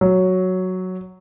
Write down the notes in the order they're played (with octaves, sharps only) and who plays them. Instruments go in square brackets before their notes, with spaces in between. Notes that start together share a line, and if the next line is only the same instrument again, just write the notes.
[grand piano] F#3